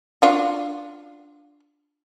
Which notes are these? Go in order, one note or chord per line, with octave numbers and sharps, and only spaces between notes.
D4 F4 F#4